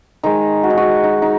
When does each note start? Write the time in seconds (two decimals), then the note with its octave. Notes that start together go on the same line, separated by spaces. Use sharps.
0.23 D#3 G#3 D#4
0.63 F#4
0.70 D#4
0.77 F#4
1.04 D#4
1.22 D#4